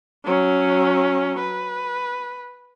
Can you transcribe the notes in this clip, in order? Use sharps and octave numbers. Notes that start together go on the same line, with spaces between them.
F#3 C#4
B4